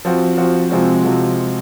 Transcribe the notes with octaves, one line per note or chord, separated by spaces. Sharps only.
F3 C4 F#4
F3 C4 F#4
C3 F3 G#3 C4 F#4
C3 F3 G#3 C4 F#4